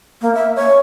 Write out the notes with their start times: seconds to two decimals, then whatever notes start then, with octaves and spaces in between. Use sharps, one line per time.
0.22 A#3
0.35 E5
0.56 C#5